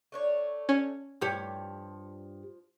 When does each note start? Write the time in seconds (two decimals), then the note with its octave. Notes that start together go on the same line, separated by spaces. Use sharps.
0.12 A3 D4 C#5
0.69 C#4
1.21 G2 F3 G4 C#5